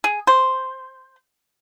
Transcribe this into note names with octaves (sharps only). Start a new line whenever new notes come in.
G#4
C5